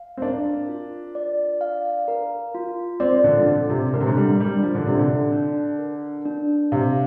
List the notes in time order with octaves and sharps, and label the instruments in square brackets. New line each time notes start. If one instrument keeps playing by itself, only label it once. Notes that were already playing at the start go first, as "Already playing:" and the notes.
Already playing: [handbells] F5
[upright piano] C4
[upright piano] D4 [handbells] A#4
[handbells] F4
D5
F5
A#4
F4
[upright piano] C4 [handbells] D5
[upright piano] D3
F3
[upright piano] D3 [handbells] D4
[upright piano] C3
[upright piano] D3 [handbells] A#4
[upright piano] C3
D3
G3
[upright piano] G3 [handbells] D4
[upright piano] F3
D3
[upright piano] C3 [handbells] D5
[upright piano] D3
[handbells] D4
A#4
D4
[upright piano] C3 [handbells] F5